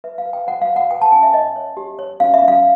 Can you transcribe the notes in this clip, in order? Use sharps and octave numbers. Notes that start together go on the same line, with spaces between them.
B4 E5
F5
B4
G5
C5 F#5
F5
C5
F#5
B4 G5
A5
C#4 G#5
E5
C#5 D#5
C#5
G4
C#5
C#4 F5
E5
C#4
F5